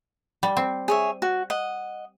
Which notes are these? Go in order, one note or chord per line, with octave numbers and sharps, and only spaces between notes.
G3
C4
G#4 C#5 E5
F#4
D#5 F#5